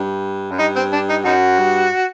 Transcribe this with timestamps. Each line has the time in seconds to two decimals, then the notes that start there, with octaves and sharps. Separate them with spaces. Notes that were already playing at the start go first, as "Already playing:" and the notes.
Already playing: G2
0.52 F#2
0.60 G2 D#4
0.76 C4
0.93 D4
1.09 D#4
1.25 F#2 D#4 F#4
1.59 G2